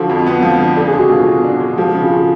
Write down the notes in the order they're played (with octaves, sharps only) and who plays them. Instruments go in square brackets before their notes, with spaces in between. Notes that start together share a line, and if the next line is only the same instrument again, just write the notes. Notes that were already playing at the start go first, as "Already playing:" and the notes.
Already playing: [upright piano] D3 F3 [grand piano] F#4 A4
[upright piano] F2
B3
F3
D3
[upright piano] D4 [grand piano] A4
[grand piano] G#4
[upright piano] G#3
[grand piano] F#4
[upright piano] B2 [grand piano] F4 G#4
[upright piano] B2
D4
G#3
[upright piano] F3 [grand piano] F#4 A4
[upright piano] C#3
[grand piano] F4 G#4